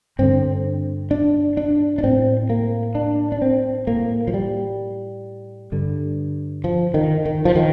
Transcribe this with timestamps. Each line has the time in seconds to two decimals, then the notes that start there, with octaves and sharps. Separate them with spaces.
0.19 G2 D3 C4
1.11 D4
1.57 D4
1.98 D4
2.03 A2 C4
2.50 A#3
2.95 D4
3.32 D4
3.42 C4
3.87 A2 A#3
4.27 F3
4.34 G3
5.72 G2 D3
6.64 F3
6.94 D#3
7.25 D#3
7.45 F3
7.55 D#3